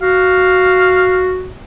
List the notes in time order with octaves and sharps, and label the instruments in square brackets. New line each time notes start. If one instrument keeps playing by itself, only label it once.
[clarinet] F#4 [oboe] F5